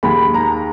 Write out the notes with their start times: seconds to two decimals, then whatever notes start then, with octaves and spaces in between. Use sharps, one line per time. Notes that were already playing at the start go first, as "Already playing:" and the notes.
0.03 D#2 D#3 G#3 B5
0.34 A#5